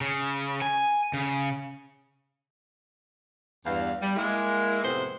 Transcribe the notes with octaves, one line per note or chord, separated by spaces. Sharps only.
C#3
G#5
C#3
E2 G2 F5
G3
G#3 A#3 E4
F2 A2 C3 B3 G#4 C5